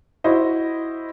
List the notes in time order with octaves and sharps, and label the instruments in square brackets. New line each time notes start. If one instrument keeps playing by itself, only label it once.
[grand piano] E4 F#4 C5 D#5